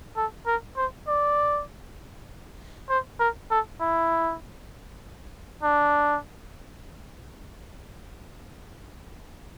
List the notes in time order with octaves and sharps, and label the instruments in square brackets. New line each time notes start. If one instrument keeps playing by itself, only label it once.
[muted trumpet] A4
A#4
C5
D5
C5
A#4
A4
E4
D4